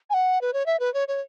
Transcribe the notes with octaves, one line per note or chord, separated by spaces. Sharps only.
G#5
F#5
B4
C#5
E5
B4
C#5
C#5